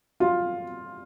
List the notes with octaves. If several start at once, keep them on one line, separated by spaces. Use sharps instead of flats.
F4